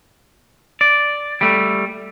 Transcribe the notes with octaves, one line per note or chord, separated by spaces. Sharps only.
D5
G3 A3